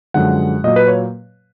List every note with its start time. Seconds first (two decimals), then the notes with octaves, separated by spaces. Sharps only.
0.14 F#2 D3 F3 G#3 F#5
0.64 A#2 F#3 A#3 D#5
0.76 B4
0.88 C#5